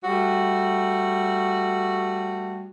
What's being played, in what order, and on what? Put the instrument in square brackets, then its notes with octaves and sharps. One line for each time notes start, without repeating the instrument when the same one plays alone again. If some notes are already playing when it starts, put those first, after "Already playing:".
[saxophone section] G3 A3 F#4